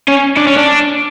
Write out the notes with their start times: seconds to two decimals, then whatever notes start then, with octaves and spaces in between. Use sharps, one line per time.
0.08 C#4
0.37 D4
0.47 C#4
0.57 D4